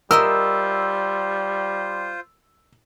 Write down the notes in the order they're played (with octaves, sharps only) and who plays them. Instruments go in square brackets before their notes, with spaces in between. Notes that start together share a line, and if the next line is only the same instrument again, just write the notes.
[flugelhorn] G3 [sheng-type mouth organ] F4 C5 [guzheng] A#4 D#5 E5 [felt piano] E6